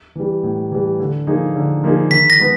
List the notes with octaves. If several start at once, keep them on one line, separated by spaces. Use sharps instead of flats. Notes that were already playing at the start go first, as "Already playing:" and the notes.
E3 G3
A2
E3 G3
D3
F3 A#3 D#4 G#4
D3
F3 A#3 D#4 G#4
D#3 B6
A#6
G#3 B3